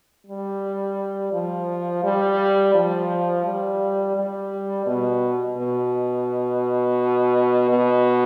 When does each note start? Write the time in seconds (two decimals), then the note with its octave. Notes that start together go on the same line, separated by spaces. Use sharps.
0.27 G3
1.32 F3
2.04 G3
2.74 F3
3.45 G3
4.16 G3
4.86 B2
5.58 B2
7.69 B2